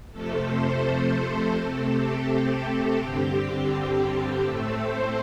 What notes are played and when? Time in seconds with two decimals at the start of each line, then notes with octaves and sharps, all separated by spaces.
0.12 F2 C3 F3 A3 A4
0.48 C5
1.20 C5
1.55 C3 A3 C4 A4
1.91 G4
2.98 G2 D3 G3 C4 G4
3.70 G4
4.42 A2 A3 C4 A4
4.78 C5